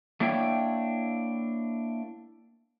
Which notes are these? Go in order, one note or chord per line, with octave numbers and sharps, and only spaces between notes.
A3 A#3 D4 E4 C#5 G5